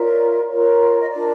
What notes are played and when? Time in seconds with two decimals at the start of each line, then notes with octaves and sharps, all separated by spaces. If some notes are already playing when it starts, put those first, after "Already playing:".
Already playing: F4 A#4 C#5 D5 E5
0.49 F4 A#4 C#5
0.99 D#5
1.11 D4 F4 A#4 D5